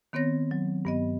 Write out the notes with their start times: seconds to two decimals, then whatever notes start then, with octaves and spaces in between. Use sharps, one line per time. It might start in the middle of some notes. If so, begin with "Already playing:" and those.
0.13 D#3 B3 C4 C#5 A#6
0.51 F#3
0.85 G2 B3 D#5